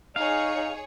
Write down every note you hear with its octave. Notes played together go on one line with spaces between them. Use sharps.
D#4 G#4 C#5 F5